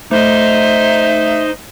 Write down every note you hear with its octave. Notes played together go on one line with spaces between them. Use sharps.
A3 D#4 C5 D#5 E5